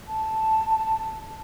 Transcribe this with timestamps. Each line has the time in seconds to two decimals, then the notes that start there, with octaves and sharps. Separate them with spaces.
0.07 A5